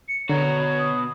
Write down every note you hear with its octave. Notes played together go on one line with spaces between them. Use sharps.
C#7
B2 D3 F#4 C#5 A#5
D#6